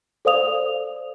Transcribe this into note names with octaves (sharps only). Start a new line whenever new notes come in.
A4 C5 D5 F5 D#6 F7